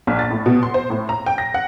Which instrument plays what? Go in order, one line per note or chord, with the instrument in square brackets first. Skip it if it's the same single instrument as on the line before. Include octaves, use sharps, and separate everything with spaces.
[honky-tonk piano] A#1
A6
A2
B2
C6
C5
A2
A#5
G5
A#6
F#5